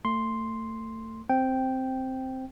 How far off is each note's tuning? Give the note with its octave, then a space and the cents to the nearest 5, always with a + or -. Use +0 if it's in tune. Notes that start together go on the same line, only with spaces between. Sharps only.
A3 +30 C6 +0
C4 +0 G5 -5